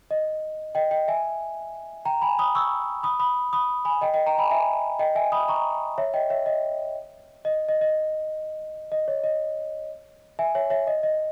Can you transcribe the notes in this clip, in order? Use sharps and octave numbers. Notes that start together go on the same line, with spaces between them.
D#5
D#5 G5
D#5 G5
E5 G#5
G5 A#5
G#5 B5
B5 D#6
C#6 E6
B5 D#6
B5 D#6
B5 D#6
G#5 B5
D#5 G5
D#5 G5
G5 A#5
G#5 B5
E5 G#5
D#5 G5
E5 G#5
B5 D#6
A#5 C#6
C#5 E5
D#5 G5
C#5 E5
D#5
D#5
D#5
D#5
D#5
C#5
D#5
E5 G#5
C#5 E5
C#5 E5
D#5
D#5